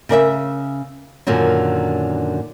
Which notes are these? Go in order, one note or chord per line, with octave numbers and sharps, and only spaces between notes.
C#3 A#4 D5 E5
F#2 A#2 D3 D#3 F#3